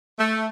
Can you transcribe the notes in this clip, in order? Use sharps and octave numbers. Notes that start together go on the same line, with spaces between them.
A3